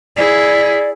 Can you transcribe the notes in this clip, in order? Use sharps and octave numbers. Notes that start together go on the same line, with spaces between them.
E4 G#4 D5